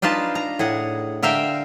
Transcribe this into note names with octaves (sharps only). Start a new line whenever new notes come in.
D4 D#4 F4 B4 A5
A#5
A2 G#4 F#5
D3 A#4 E5 F5 G5